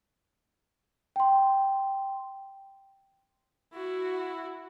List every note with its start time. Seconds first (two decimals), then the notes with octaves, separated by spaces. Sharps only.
1.16 G5 C6
3.73 E4 F#4